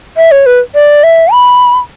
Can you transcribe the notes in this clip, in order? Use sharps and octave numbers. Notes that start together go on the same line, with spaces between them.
E5
C#5
B4
D5
E5
B5